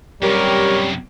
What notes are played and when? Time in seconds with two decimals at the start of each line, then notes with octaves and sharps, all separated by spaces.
0.22 F#2 C3 G3 G4 A#4 C#5